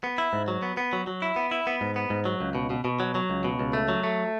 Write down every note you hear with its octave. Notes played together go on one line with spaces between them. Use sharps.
B3
E4
G#2
F#3
B3
B3
F#3
F#3
E4
B3
E4
B3
G#2
B3
G#2
F#3
C#2
B2
B2
B2
F#3
F#3
C#2
B2
C#2
A3
F#3
A3